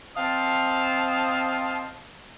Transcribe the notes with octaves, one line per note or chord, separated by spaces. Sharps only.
C4 C5 D#5 F5 A5